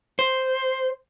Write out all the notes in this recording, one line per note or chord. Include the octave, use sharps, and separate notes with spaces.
C5